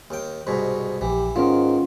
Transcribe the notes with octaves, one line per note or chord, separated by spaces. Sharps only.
D#2 G5
C2 G#2 B2
A#1 E3 G4
G#2 D#3 B3 C#4 F4